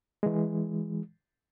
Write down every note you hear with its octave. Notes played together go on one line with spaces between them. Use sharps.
E3 G#3